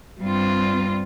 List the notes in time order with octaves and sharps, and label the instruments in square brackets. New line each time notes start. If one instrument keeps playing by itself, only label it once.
[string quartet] G2 G3 C4 F4